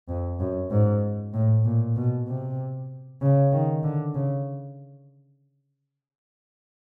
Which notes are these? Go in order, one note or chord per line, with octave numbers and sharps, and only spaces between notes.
F2
F#2
G#2
A2
A#2
B2
C3
C#3
D#3
D3
C#3